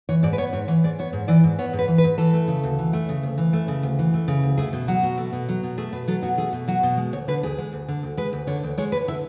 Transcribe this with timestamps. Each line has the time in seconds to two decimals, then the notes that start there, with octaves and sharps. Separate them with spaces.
0.09 E3 C#5
0.23 G#2 D5
0.33 B4
0.38 B3 C#5
0.53 G#2 C#5
0.68 E3 C#5
0.84 G#2 D5
0.99 B3 C#5
1.13 G#2
1.28 E3 D5
1.44 G#2
1.59 B3 C#5
1.73 G#2
1.79 B4
1.88 E3
1.98 B4
2.04 G#2
2.18 E3 A4
2.33 A3
2.48 C#3
2.64 D2
2.79 E3
2.93 A3
3.09 C#3
3.23 D2
3.38 E3
3.53 A3
3.68 C#3
3.83 D2
3.99 E3
4.14 A3
4.28 C#3
4.43 D2
4.58 A3 G#4
4.73 B2
4.88 F#3 F#4
5.03 B2
5.18 A3
5.33 B2
5.49 F#3
5.63 B2
5.78 A3 G#4
5.93 B2 B4
6.08 F#3 A4
6.23 B2 F#4
6.38 A3 G#4
6.53 B2
6.68 F#3 F#4
6.83 B2
6.97 G#3
7.13 D2 C#5
7.28 D3 B4
7.43 D2 G#4
7.58 G#3
7.73 D2
7.88 D3
8.03 D2
8.17 G#3 B4
8.33 D2
8.47 D3 C#5
8.63 D2
8.78 G#3 C#5
8.92 D2 B4
9.08 D3 E4